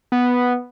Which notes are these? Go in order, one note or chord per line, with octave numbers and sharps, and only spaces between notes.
B3